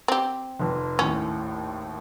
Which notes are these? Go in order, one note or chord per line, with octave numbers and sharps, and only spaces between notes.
C4 G4
F1 F2
G#1 D#2 A2 C#4